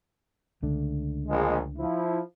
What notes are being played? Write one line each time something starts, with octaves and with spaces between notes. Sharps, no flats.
C#2 D3 A3
A#1 G#3
F3 E4